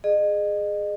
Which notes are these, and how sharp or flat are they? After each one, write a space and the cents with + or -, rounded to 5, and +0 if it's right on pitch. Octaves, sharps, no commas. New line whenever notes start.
G#4 +0 D#5 -35